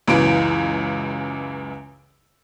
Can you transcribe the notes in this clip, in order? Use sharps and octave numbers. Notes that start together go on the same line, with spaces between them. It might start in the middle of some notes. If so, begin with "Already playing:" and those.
C#2 F#2 E3 D7